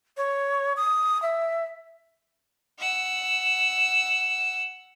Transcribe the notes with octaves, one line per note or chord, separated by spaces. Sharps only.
C#5
D#6
E5
F#5 E6